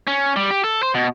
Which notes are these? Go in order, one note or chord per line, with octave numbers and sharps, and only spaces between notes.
C#4
G3
G4
A4
C5
B2